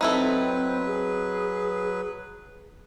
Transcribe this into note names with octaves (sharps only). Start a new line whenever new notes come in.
F#3 C4 D#4 E4 A4 B4
G#4